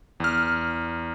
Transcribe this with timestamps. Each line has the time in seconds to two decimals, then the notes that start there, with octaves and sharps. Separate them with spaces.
0.20 E2 F6